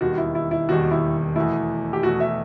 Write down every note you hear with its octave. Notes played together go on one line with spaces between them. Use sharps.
E1 D#2 D#3 G3 F#4
E4
E4
E4
E1 D#2 D#3 G3 F#4
E4
E2 B2 A3 E4
G4
E2 B2 A3 F#4
E5